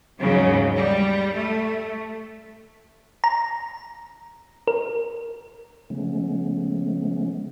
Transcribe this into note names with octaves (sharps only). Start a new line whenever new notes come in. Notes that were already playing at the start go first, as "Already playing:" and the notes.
D#2 G#2 C#3 F#3
G3
A3
A#5
A#4
C#3 F3 G#3 A3 B3 C#4